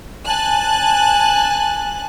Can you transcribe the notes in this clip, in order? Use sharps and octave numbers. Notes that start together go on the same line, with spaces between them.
G#5 A5 F#6